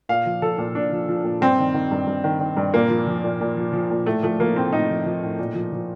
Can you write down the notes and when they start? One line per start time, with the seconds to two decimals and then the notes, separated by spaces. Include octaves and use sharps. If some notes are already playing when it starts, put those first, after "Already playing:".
0.09 A#2 F5
0.26 F3
0.42 F3 A4
0.58 A#2
0.75 A#2 D4
0.92 F3
1.09 F3
1.24 A#2
1.41 G2 C4
1.59 D#3
1.74 D#3
1.91 G2
2.07 G2
2.24 D#3
2.40 D#3
2.57 G2
2.74 A#2 A#3
2.90 F3
3.07 F3
3.24 A#2
3.41 A#2
3.57 F3
3.73 F3
3.90 A#2
4.06 A2 A3
4.23 F3 A3
4.40 F3 A#3
4.56 A2 C4
4.73 A2 D#4
4.90 F3
5.06 F3
5.23 A2
5.39 A#2
5.55 F3
5.72 F3